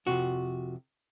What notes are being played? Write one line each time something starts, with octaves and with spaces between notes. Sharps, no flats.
F2 C3 F3 F#4